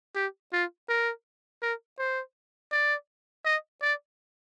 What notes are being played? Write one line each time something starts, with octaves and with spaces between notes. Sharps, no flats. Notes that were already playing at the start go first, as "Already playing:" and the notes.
G4
F4
A#4
A#4
C5
D5
D#5
D5